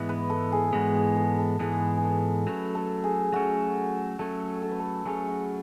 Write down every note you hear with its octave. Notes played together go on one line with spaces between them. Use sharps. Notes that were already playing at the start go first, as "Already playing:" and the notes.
Already playing: G#2 E3 G#3 B3 E4
B4
A4
G#4
G#2 E3 G#3 B3 F#4
G#4
A4
A4
G#2 E3 G#3 B3 G#4
G#4
A4
F#3 A3 C#4 B4
A4
G#4
F#3 A3 C#4 F#4
F#3 A3 C#4 A4
A4
B4
A4
F#3 A3 C#4 G#4
F#4